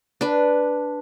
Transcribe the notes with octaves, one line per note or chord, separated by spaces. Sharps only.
D4 B4